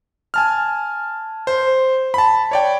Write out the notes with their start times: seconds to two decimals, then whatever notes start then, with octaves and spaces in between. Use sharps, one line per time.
0.34 G#5 A5 F6
1.47 C5
2.14 A5 B5
2.51 C#5 D5 G5